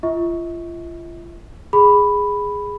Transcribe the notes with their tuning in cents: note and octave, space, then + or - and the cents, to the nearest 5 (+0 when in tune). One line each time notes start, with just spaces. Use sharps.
F4 -35 E5 -45 C#6 +0
G#4 -10 B5 +0